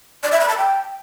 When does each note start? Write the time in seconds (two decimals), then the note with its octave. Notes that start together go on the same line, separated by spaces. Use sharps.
0.23 D5
0.32 E5
0.40 B5
0.49 A5
0.57 G5